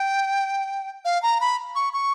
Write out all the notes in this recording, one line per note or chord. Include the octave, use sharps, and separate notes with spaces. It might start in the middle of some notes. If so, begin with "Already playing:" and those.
Already playing: G5
F5
A#5
B5
C#6
C#6